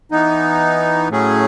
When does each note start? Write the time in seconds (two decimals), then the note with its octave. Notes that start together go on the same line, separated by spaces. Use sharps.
0.12 E3 B3 D#4
1.09 A2 F#3 A3 C#4 G#4